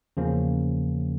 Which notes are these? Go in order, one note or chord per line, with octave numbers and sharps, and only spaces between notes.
E2 C#3 F3 A#3 C#4